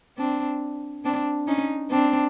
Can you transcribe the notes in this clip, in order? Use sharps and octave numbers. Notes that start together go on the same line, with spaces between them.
C4 D4
C4 D4
C#4 D#4
C4 D4